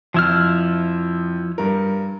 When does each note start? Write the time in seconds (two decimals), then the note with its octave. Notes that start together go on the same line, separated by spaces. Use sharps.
0.14 F2 F3 E4 F6
1.58 G2 A#4